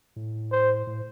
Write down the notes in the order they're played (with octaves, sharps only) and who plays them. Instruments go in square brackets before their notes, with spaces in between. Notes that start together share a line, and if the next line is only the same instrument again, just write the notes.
[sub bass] A2
[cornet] C5
[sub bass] A2